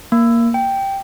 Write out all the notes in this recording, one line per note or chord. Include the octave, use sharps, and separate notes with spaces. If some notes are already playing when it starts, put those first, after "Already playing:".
A#3
G5